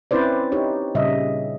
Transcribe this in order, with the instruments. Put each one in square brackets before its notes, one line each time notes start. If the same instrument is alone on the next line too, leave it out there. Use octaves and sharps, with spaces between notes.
[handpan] C4 C#4 E4 B4 C5 D5
D#4 G4 C#5
A#2 C#3 G3 D#5 E5